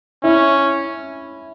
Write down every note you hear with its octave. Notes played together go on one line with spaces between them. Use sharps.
C#4 E4